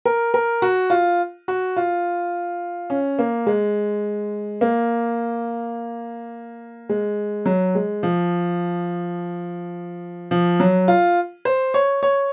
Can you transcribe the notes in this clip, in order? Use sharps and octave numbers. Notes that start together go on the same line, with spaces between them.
A#4
A#4
F#4
F4
F#4
F4
C#4
A#3
G#3
A#3
G#3
F#3
G#3
F3
F3
F#3
F4
C5
C#5
C#5